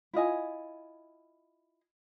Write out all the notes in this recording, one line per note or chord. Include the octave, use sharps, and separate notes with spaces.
E4 F4 D#5 G#5